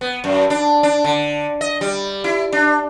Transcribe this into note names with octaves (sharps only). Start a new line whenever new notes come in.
B3
F#2
D4
D4
D3
D#5
G3
E4
D4